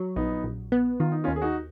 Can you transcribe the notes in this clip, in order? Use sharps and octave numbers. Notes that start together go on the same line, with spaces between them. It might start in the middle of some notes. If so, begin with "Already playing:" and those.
Already playing: F#3
A#1 B3 D#4
A#1
B3
D#3 F4
D#4
C#4 F4
D#2
G#4
D#4 F#4